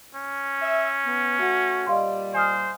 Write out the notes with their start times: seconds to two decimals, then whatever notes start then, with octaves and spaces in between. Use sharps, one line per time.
0.15 C#4
0.61 E5
1.05 B3
1.39 A3 F#4
1.87 A#2 G3 D#5 F5 C6
2.34 C5 G#5 D#6 F6